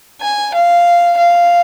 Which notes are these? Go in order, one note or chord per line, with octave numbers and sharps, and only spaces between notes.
G#5
F5
F5